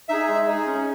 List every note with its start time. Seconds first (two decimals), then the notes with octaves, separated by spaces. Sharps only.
0.09 D#4 G#4 E5
0.28 G#3
0.48 D#4 G#4
0.66 C#4